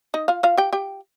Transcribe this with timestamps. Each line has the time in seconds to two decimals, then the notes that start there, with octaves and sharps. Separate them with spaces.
0.14 D#4 D#5
0.28 F4 F5
0.43 F4 F5
0.57 G4 G5
0.73 G4 G5